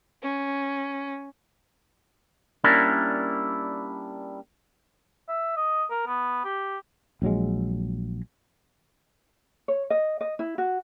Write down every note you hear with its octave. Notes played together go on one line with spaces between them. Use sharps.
C#4
G3 A#3 C#4 D4 E4 A#4
E5
D#5
A#4
B3
G4
A#1 F#3 G#3
C#5
D#5
D#5
E4
F#4